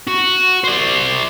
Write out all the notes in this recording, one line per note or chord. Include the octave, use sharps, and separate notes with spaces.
F#4
C5 D5